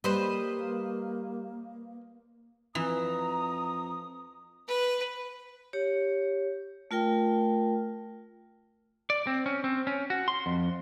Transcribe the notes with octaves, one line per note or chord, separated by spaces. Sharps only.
G3 A#3 B4 C5 D#5
F2 E3 A#5 D#6
B4
G4 C#5
A3 F4 A#4 G5
D5
C4
C#4
C4
C#4
F#4
C6
F2